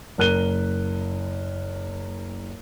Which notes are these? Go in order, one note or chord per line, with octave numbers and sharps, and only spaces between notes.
F#1 A#4 F#6 D#7 G7